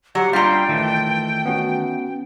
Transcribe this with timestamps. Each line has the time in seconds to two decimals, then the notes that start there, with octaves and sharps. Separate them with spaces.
0.15 F#3 G4 F#5
0.33 G3 D4 F4 F5 G5 A#5 C6
0.69 D#3 E3 A3
1.45 B3 C#4 F#4